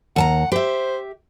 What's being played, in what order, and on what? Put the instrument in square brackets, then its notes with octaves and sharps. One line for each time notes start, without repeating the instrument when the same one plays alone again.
[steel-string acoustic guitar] D#2 A5 A#5 [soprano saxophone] F#5
[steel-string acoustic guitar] G4 E5 [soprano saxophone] C5